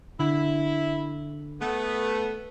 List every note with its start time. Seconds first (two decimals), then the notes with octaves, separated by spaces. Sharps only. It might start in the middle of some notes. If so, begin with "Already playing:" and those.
0.19 D3 E4
1.61 A3 B3